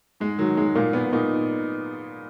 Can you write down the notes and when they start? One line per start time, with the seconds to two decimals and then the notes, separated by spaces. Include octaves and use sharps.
0.20 G#2 G#3
0.38 D#3 F#3
0.57 G#2 G#3
0.75 A#2 A#3
0.93 A#2 B3
1.12 A#2 D#4